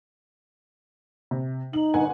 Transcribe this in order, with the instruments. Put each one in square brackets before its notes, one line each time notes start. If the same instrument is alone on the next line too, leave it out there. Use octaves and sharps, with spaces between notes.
[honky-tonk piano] C3
[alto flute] D#4 [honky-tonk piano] F#7
[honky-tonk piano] G1 F#5 G#5